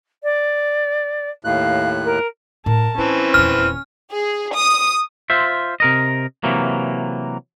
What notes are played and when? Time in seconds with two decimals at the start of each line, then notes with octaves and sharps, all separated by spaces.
0.23 D5
1.45 D#2 A2 F5 F#6
2.04 A#4
2.66 A2 A#4 A5
2.98 E3 C4 C#4 D#4 B4
3.34 D#1 E2 F6
4.11 G#4
4.54 D#6
5.30 F4 C5 E5
5.80 C3 A#4 D#5
6.44 C3 E3 F#3 A#3